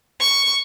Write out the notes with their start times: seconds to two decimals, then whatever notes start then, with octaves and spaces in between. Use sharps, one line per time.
0.20 C#6